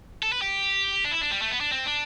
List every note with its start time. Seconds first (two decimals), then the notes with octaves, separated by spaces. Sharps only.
0.23 A4
0.32 B4
0.42 G4
1.05 D4
1.11 E4
1.21 D4
1.31 G3
1.42 A3
1.51 B3
1.61 D4
1.71 C4
1.86 D4